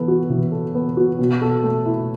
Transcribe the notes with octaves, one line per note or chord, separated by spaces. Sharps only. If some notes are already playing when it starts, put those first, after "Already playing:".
Already playing: E3 B3 A4
F#4
E3
A4
B3
F#4
B2
A4
A3
E4